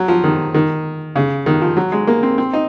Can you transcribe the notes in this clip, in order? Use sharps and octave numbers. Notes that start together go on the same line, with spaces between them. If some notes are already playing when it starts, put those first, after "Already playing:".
Already playing: F#3
F3
D#3
D#3
C#3
D#3
F3
F#3
G#3
A#3
C4
C4
D#4